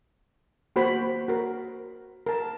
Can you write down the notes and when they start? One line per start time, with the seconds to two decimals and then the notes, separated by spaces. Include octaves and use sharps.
0.76 A#3 F#4 C5 B5
1.28 F#4 A#4
2.26 A#4 A5